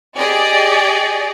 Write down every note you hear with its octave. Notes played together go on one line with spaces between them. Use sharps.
G4 G#4 D5 D#5